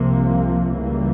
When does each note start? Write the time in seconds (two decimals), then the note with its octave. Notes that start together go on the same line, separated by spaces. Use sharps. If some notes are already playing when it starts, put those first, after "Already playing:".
Already playing: C2 C3 F3 A#3
0.76 C#2 C#3 E3 G3 A#3